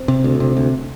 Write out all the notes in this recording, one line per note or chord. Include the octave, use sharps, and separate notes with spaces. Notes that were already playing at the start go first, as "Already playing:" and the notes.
Already playing: C4
C3
D2
C3
D2